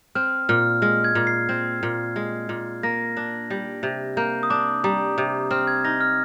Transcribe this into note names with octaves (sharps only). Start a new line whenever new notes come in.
C4 F6
A#2 F6
G#3 F6
G#6
A#2
C7
C4
A#2
G#3
A#2
A#3 A#6
D4
G3
C3
A#3 G6
D#6
D4 D6
G3 A#5
C3
C4 F6
G#6
D#4 A#6
F6